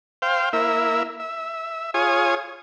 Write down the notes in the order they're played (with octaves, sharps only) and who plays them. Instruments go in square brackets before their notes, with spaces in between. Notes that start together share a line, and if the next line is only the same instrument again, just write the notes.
[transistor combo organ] C5 F5 G5
A#3 E4 E5
E5
F4 G#4 C#5 G#5 D#6